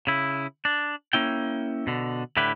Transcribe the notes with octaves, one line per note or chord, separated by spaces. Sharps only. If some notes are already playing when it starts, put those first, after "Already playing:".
C#3 E4
D4
A#3 C#4 E4 G5
B2 D3
A2 D3 E4 G4 B4